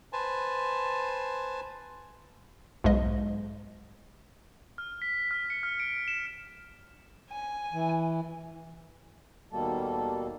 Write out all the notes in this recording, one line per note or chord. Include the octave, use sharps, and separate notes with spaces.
B4 C5 G#5 A5
B1 G#2 G#3 D#5
F6
B6
F6
C#7
F6
D7
E7
G#5
E3
D#2 B2 G3 A#3 A4